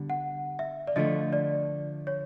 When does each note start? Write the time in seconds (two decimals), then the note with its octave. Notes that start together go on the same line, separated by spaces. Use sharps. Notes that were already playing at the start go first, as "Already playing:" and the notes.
Already playing: D3 G3 B3
0.10 F#5
0.59 E5
0.87 D5
0.96 D3 F3 A3 D#5
1.33 D5
2.07 C#5